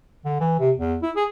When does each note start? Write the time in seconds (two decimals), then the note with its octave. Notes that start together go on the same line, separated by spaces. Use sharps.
0.25 D3
0.40 E3
0.59 C3
0.78 E2
1.02 E4
1.16 G#4